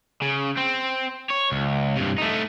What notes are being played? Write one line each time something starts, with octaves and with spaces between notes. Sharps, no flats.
C#3
C4
C#5
C#2
G2 C3
A3 D#4